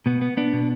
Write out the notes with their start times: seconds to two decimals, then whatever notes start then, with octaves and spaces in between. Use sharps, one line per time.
0.06 B2 B3
0.22 B3
0.37 B3 D4
0.53 B2